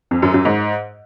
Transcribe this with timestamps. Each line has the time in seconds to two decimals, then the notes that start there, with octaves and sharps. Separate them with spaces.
0.11 F2
0.22 F#2
0.34 F#2
0.45 G#2